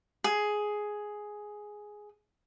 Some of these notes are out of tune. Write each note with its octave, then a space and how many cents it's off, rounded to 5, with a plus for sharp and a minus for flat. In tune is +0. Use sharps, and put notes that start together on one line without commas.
G#4 +5